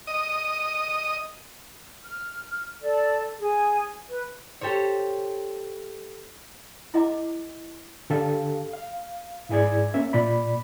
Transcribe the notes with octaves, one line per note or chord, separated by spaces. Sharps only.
D#5
F6
A4 D5
G#4
B4
G4 A4 C5 C#5
E4 G#4 D#5 F#5 A#5 D6
D3 G4 A4 F5
F5
G#2 E4 G#4 D5 G#6
A#3 C#4 E5
A#2 D5 B5